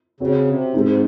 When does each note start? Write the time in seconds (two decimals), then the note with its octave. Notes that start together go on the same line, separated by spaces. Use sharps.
0.20 C#3 C4 F#4 C#5
0.47 C3
0.74 G#2 G#3 C4 D#4